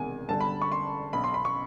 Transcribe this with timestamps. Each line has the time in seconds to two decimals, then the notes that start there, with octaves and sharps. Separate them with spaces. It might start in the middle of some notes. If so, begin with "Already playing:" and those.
Already playing: E1 E2 C3 D#3 G#5
0.29 G1 G2 D3 A5
0.40 B5
0.62 C#6
0.72 C6
1.13 B1 B2 B5
1.24 C6
1.34 B5
1.45 C#6